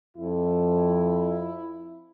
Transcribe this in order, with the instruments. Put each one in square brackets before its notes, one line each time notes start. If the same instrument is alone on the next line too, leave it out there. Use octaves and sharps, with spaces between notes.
[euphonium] F2 [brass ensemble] E4